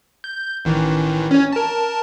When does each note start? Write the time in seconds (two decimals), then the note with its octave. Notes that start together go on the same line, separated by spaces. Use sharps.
0.24 G6
0.65 A1 D#3 E3
1.31 C#4 C#5
1.53 A#4 A5